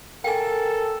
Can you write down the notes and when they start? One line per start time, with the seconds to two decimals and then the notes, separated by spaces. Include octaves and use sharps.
0.24 A4 A#4 G5 G#5